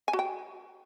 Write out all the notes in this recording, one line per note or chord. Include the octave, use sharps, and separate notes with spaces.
G#5
F#4
G5